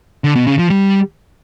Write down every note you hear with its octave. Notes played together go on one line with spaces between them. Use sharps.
D3
B2
C#3
F3
G3